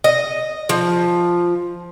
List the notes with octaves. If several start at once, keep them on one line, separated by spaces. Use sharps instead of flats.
D#5
F3